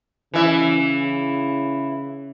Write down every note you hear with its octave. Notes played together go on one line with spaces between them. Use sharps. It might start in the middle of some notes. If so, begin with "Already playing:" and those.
C#3 E3 E5